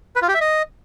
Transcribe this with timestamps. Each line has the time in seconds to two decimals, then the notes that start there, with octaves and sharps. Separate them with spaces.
0.16 B4
0.22 F4
0.28 G4
0.34 E5
0.41 D#5